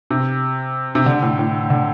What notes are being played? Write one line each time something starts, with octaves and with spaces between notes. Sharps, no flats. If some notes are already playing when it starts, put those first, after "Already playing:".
C3
C3
D3
A2
A2
D3